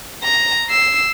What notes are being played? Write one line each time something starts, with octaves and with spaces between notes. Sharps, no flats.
A#5
E6 C7